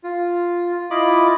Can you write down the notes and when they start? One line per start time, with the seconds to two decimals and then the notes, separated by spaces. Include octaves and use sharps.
0.04 F4
0.91 E4 F4 D#5 B5 D6